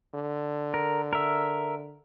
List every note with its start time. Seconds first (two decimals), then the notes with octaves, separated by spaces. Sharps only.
0.14 D3
0.74 A#4
1.13 A#4 E5